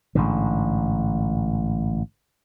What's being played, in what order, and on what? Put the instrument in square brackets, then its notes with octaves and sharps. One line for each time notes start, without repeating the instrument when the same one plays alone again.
[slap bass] A1 G#2 D3